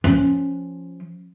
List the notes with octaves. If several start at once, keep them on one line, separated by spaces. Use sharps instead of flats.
F3 C#4